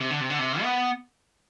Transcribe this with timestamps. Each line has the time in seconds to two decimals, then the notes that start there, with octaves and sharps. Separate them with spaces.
0.01 C3
0.10 D3
0.20 C3
0.30 D3
0.39 C3
0.62 B3